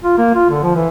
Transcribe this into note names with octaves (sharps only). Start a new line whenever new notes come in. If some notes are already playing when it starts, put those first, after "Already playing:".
F4
A#3
F4
D3
F3
E3